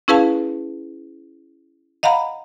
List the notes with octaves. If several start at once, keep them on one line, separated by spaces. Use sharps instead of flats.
C#4 E4 G#4 B4 F5 A5
D#5 F5 F#5 A#5 B5